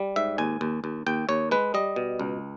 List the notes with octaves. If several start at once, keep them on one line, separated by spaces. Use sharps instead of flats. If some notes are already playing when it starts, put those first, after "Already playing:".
Already playing: G3
G#2 E5
D#2 G#5
D#2
D#2
D#2 G5
D#2 C#5
G#3 B4
G3 D#5
B2
C#2